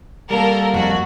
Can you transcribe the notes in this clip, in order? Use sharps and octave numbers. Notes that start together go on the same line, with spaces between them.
G3 A#3 A4 A#4
F2 F#3 F#4